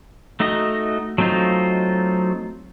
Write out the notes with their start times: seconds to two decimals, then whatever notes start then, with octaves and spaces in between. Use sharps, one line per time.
0.40 A3 D#4 F#4 D#5
1.18 F#3 A3 C4 D#4 F4